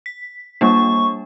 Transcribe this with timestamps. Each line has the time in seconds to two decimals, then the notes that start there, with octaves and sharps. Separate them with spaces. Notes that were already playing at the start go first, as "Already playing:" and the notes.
0.06 B6
0.61 G3 A#3 D4 C#6